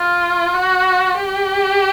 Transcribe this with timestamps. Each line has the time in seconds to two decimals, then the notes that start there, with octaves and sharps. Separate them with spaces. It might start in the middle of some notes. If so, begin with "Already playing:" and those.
Already playing: F4
0.54 F#4
1.14 G4